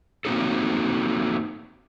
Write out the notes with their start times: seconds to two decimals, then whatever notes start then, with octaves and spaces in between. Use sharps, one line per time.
0.25 A3 A#3 C4 D#4 F#4 A4